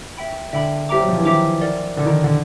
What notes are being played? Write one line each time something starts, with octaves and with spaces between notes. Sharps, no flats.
E5 G5 B5
D3 E5 G5 B5
G3 C5 E5 G5 A#5 D6
F#3
F3
E3
D#3 C5 E5 G5 A#5 D6
A#4 D5 F#5
D3 A#4 D5 F#5
D#3
D3